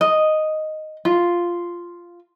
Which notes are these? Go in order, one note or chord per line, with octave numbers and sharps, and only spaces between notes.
D#5
F4